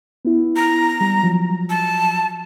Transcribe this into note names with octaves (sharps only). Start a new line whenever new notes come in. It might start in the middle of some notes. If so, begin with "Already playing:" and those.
B3 E4
A#5
G3
F3 F#3
A5